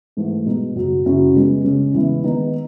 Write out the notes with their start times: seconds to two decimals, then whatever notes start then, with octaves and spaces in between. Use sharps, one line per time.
0.17 G#2 E3 A3
0.46 B2 G#3 B3 D#4
0.76 F#2 C#3 F#3
1.06 F#2 C#3 F#3 C#4 E4
1.34 C#3 G#3 B3
1.64 C#3 G#3 C#4
1.94 E2 C#3 G#3 B3 E4
2.24 D#3 G#3 B3 D#4